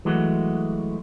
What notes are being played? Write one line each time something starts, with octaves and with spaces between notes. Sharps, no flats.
E3 F#3 G#3 A3 F#4